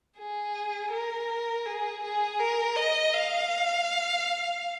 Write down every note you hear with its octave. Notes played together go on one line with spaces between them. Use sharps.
G#4
A#4
G#4
G#4
A#4
D#5
F5